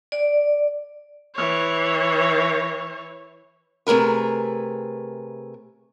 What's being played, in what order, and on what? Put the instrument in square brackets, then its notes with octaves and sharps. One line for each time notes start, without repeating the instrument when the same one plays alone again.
[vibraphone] D5
[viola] E3 C#5
[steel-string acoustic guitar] C3 A3 G#4 A#4 B4